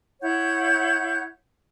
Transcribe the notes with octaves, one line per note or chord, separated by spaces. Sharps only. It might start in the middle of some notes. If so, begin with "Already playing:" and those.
E4 C#5 F#5 G6